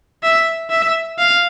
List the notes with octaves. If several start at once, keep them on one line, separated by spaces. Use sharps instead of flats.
E5
E5
F5